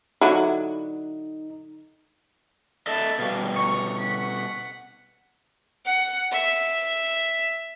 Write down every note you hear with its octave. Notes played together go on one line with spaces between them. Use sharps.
D3 F#3 D#4 E4
A4 D#5 E5 A5 B5
B2 G3 F5
A#5 C#6
F#5 B6
F#5
E5